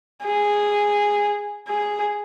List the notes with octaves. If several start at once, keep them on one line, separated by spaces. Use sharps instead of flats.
G#4
G#4